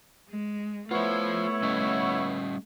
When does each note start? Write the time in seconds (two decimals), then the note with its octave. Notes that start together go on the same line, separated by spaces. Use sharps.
0.30 G#3
0.91 A3 B3 E4 F4 C5 C#5
1.63 G3 C#4 D#5